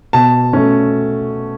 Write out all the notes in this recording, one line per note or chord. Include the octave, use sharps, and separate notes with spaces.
B2 A5
A3 C#4